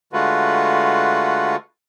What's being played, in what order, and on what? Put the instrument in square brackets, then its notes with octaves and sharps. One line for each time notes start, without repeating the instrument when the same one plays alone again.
[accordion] D3 G#3 A3 F4 F#4 B4